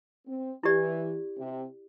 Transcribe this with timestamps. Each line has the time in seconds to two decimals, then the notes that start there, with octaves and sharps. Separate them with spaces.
0.27 C4
0.63 E3 E4 G4 D5
1.38 C3